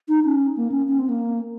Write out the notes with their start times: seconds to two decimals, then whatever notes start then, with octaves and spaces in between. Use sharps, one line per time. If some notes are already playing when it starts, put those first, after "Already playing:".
0.08 D#4
0.25 C#4
0.57 A#3
0.71 C#4
0.88 C#4
0.99 C4
1.09 A#3